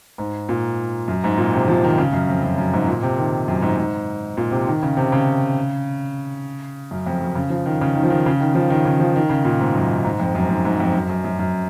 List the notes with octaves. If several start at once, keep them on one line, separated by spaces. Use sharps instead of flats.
G#2
A#2
F#2
G#2
A#2
C3
F3
D#3
C#3
F#2
F2
F#2
F#2
G#2
A#2
C3
D#3
F#2
G#2
G#2
A#2
C3
D#3
C#3
C3
C#3
F#2
F2
F#2
C#3
F3
D#3
C#3
D#3
F3
D#3
C#3
D#3
F3
D#3
C#3
F3
D#3
C#3
A#2
G#2
F#2
G#2
F2
F#2
G#2
G#2
F2
F#2
F#2
F#2
F#2